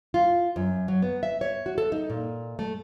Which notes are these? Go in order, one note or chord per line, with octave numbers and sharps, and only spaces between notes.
F4
F#2
F#3
B3
E5
C#5
F#4
A4
D#4
A#2
A3